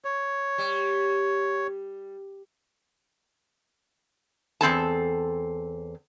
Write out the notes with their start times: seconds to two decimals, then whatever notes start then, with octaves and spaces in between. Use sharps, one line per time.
0.05 C#5
0.58 G3
4.61 E2 C4 A4 A5